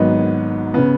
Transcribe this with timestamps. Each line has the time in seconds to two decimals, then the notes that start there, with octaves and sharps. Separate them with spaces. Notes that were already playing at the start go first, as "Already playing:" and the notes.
Already playing: G#1 G#2 D#3 F#3 B3 D#4
0.74 C#3 B3